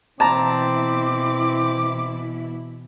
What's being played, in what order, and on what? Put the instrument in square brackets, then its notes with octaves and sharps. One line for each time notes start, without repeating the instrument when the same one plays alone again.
[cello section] B2 E3 E4 [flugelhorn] C4 [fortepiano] A5 A#5 [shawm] D6